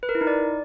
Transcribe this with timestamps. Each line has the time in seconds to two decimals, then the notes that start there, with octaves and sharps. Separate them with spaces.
0.03 B4
0.09 A#4
0.15 E4
0.21 D#4
0.27 D5